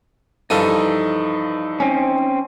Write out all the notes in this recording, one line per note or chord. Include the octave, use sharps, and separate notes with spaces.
G2 E3 F3 D#4 A4 A#4 D#7
C4 C#4